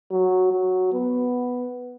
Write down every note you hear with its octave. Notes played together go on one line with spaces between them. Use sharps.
F#3
F#3
B3